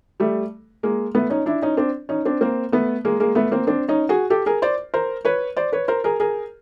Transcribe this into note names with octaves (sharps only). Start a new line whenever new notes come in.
G3 A3
G#3 A#3
A3 B3
C#4 D#4
D4 E4
C#4 D#4
C4 D4
C#4 D#4
C4 D4
A#3 C4
A3 B3
G#3 A#3
G#3 A#3
A3 B3
A#3 C4
C4 D4
C#4 D#4
F#4 G#4
G4 A4
G#4 A#4
C5 D5
A#4 C5
B4 C#5
C5 D5
B4 C#5
A#4 C5
G#4 A#4
G#4 A#4